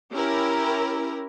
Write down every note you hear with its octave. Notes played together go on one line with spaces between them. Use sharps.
C#4 E4 G4 A#4